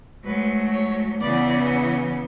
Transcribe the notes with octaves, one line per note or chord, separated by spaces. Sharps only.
G#2 F#3 A3 B4
C#5
E2 C#3 E3 B3 D5